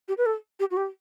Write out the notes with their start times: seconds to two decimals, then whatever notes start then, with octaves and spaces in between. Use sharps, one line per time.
0.08 G4
0.17 B4
0.26 A4
0.60 G4
0.71 F#4
0.77 G4